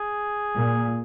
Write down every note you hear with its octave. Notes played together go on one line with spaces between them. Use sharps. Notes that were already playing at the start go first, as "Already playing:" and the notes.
Already playing: G#4
A#2